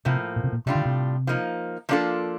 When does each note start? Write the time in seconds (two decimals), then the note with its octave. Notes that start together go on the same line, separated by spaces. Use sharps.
0.05 A2 C3 F3 A#3
0.36 A#2
0.44 C3
0.52 A#2
0.66 A2 C3 G3 D4 F4
0.75 D3
0.85 C3
1.27 F3 A#3 D#4
1.89 F3 A#3 D4 F4 A4